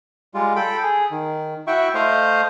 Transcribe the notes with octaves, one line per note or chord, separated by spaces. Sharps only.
G3 G#3 F4
A4 G5 B5
G#4
D#3
E4 F#4 E5 G5 C#6
A3 C5 D#5 F5